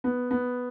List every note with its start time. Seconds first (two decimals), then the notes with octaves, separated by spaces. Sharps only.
0.04 B3
0.31 B3